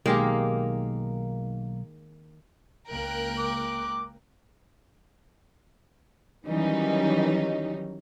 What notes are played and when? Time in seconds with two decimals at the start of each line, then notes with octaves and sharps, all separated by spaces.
0.06 B1 D#3 G#3 A#3 G4
2.89 C#2 A#3 A#4 G5 F#6
3.38 D6
6.46 D#3 E3 F#3 G3 C#4 D#4